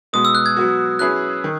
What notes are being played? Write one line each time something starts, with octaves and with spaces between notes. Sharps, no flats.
B2 G#3 B3 D#6
E6
F#6
G#6
F#3 B3 F#4
F#3 C#4 E4 G#4 B4 F#6
D#3